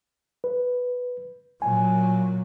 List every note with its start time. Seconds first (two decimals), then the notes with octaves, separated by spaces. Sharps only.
0.44 B4
1.62 A#2 F#3 G#5